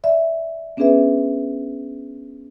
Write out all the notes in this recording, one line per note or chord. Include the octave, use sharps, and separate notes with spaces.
D5 E5
B3 C#4 D4 G#4 B4 E5